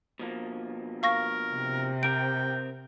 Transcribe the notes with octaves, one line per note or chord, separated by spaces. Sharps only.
B2 F3 A#3
A#4 F5 C#6 A#6
C3
C4 A#4 G5 D7